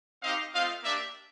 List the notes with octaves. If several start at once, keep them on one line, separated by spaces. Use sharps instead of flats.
C4 D#4 G4 D#5 F5
A3 C4 F4 D#5 F5
A#3 D4 G4 D5 E5